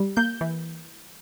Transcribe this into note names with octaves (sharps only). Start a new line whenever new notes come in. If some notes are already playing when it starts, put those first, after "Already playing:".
Already playing: G3
A#3 G6
E3